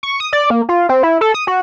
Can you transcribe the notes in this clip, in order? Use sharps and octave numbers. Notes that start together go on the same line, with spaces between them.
C#6
D#6
D5
A#3
F4
C4
E4
A4
D#6
F#4